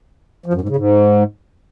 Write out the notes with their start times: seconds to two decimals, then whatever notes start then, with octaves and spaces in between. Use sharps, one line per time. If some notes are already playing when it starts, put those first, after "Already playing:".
0.46 F3
0.54 F#2
0.61 G#2
0.69 C#3
0.76 G#2